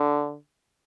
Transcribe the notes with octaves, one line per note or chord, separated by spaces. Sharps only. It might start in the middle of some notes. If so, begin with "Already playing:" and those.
Already playing: D3